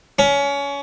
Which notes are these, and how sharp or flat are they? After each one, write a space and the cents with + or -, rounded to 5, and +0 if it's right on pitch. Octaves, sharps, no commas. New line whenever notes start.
C#4 +25